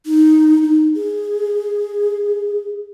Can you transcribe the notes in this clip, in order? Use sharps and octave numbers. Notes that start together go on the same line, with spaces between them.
D#4
D#4
G#4